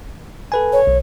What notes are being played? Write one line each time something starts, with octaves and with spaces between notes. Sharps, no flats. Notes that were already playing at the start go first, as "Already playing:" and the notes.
A4 B4 G#5
C#5
B1